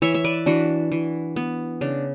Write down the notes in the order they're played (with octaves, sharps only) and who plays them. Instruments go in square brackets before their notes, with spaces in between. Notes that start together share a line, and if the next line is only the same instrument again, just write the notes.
[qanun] E3 C#5 E5
E5
B4 D5
E3 D4 F#4
E3
B3
C#3 D4